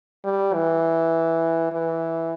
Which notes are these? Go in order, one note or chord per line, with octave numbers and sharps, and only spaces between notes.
G3
E3
E3